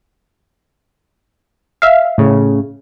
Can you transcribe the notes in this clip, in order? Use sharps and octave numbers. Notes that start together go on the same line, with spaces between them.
E5 F5
A2 C#3